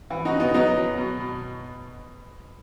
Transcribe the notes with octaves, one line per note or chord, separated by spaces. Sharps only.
E3
D#4 F#4
C#3
B3 D#4
F#3 B3 D#4
F#3
B2
B2